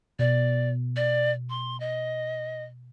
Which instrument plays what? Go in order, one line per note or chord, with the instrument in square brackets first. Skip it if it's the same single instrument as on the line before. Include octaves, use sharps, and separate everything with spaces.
[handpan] B2 [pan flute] D5
[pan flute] D5
C6
D#5